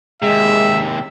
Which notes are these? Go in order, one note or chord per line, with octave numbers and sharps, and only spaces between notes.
D#2 C3 G#3 E5